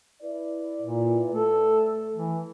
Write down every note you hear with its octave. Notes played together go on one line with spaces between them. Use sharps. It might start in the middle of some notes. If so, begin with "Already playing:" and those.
E4 B4 D5
A#2
A3 A4
E3